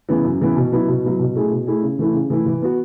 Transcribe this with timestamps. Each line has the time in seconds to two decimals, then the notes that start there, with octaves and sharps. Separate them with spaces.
0.09 C#3 E3 B3 E4
0.24 F#2
0.40 C#3 E3 B3 E4
0.56 B2
0.72 F#3 B3 E4
0.88 B2
1.04 F#3 B3 E4
1.19 B2
1.36 A3 E4 G#4
1.51 B2
1.67 A3 E4 G#4
1.83 C#3
1.99 E3 A3 E4
2.14 C#3
2.30 E3 A3 E4
2.46 E3
2.62 B3 F#4